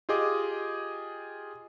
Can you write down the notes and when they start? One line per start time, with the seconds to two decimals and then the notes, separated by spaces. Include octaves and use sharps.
0.09 F4 G4 G#4 D#5 D6